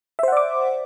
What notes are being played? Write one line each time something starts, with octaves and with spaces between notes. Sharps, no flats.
C5 D5 E5 F#5 D6